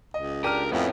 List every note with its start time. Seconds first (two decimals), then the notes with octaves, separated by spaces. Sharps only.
0.14 C#2 D#5
0.44 D4 G4 A#4 F6 D#7
0.72 F2 A2 B3 C#4 E4